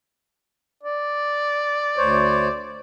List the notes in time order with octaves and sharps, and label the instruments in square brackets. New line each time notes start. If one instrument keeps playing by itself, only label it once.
[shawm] D5
[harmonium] D2 C5 C#5